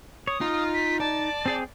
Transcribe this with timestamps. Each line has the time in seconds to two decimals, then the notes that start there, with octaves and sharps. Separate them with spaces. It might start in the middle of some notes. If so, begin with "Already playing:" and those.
0.27 C#5 D#6
0.41 D#4 F4
0.74 B6
1.00 D5 A5
1.46 C4 G#4 G5